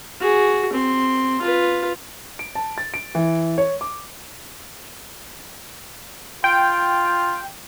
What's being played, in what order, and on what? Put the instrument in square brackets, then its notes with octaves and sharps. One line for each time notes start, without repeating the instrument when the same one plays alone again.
[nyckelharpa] F#4 G#4
C4 C6
F4 B4
[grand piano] D7
A5
A6
D7
E3
C#5
D6
[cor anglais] F4 [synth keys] G5